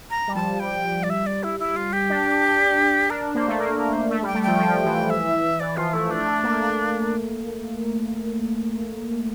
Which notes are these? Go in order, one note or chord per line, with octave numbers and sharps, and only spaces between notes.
A#5
G3
F3 A5
G3 G5
D5
E5
D5
E4
E4
F4
G4
D4
D4 A#4
A#3 C5
A3
A#3 A#4
A#4
C5
A3 E5
G3
G5
A3
F3 G5
F3
E3
E5
E3 D5
F3 F4
A3 E4
A3 D4
A3
A#3